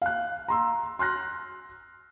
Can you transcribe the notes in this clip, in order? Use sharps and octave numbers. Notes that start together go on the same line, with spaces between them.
F5 F#6
A#5 C6 E6
C6 F6 F#6 A#6